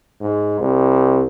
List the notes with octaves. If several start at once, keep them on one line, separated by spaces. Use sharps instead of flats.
G#2
C2